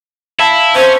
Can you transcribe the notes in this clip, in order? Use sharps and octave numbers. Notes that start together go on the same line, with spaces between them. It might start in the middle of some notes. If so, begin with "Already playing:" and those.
E4 E5 F5 A5
C#4 C5